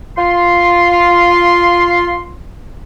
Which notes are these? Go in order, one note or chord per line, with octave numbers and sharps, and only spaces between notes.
F4 C6